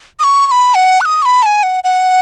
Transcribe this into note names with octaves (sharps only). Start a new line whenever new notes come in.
D#6
C#6
C#6
B5
F#5
F#6
D#6
C#6
B5
A5
G#5
F#5
F#5